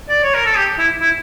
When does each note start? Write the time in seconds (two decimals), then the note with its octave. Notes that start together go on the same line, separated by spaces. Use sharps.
0.09 D5
0.23 C#5
0.34 A#4
0.45 A4
0.56 G4
0.78 E4
1.01 E4